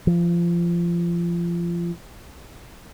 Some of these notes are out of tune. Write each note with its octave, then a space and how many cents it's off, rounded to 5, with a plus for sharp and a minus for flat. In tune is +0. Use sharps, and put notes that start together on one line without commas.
F3 -25